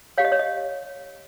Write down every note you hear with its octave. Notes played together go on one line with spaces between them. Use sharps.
G4 C#5 F5
D#5
C#5
D#5